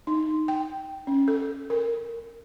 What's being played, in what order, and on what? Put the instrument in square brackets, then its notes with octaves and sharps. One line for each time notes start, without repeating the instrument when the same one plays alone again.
[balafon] D#4
G5
C#4
A4
A#4